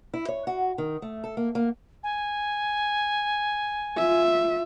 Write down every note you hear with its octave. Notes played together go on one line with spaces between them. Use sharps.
E4
C#5
F#4
D#3
A3
A4
A#3
A#3
G#5
F4 E5